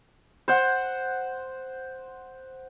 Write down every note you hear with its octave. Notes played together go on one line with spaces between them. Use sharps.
C5 F#5